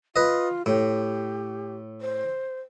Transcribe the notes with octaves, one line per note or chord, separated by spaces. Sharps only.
F4 B4 D#5
A2 G4
C5